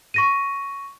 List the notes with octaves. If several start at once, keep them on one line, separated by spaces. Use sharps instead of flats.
C#6 A#6 D#7